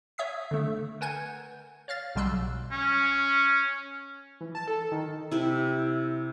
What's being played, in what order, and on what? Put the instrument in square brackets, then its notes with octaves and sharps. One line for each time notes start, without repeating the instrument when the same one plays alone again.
[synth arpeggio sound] C#5 E5 D#6 B6
D3 A3
A#4 B4 F#5 G#5 G6 G#6
C#5 F5 F6 A6
B1 B2 G3 C6 E6 F#6
[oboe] C#4
[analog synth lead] E3
A5
A4
D#3
[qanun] C3 E4